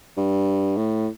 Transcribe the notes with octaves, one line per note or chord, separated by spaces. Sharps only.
G2
A2